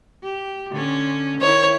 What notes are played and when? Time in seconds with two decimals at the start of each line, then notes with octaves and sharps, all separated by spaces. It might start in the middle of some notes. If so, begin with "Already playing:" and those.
0.23 G4
0.71 D3 C#4
1.41 D#3 E4 C#5